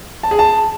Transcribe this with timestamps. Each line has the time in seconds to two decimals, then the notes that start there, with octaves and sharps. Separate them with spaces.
0.23 A5
0.31 G#4
0.39 A5